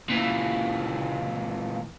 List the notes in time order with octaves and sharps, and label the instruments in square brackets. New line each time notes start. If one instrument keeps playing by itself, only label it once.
[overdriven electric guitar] A#2 E3